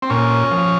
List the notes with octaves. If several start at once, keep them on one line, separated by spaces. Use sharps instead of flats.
C4
A#2 C#4
F3